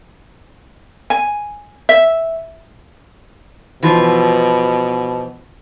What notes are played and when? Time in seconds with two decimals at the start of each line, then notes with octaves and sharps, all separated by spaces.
1.10 G#5
1.89 E5
3.83 B2 E3 F3